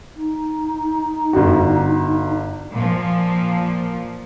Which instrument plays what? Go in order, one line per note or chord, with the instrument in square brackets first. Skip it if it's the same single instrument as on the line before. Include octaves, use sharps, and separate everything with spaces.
[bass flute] D#4
[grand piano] G1 F#4
[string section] A#2 F3